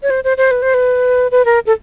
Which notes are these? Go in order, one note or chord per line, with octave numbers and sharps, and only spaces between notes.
C#5
C5
C5
C5
B4
C5
B4
B4
A#4
A4